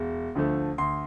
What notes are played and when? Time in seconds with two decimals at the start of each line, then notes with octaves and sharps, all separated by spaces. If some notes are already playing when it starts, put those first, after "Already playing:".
Already playing: E1
0.35 D2 D3 F3 A3
0.78 D2 C6